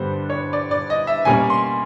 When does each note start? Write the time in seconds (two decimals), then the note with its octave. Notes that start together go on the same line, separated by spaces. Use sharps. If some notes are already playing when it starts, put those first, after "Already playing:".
Already playing: G2 D3 G3 B3 D4 C5
0.30 C#5
0.53 D5
0.71 D5
0.90 D#5
1.07 E5
1.25 B2 G3 A#3 C#4 G#5
1.50 C6